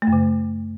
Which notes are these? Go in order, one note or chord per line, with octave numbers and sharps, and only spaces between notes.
A3
F#2
C#3